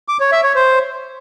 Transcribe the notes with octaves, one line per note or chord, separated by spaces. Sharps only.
D6
C#5
E5
C#5
C5